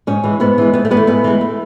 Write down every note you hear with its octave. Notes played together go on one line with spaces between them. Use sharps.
G#2 C#4
E3 G#3
G#2 B3
E3 G#3
G#2 B3
A3
E3 G#3 B3
A3
G#2 B3
E3 G#3
A3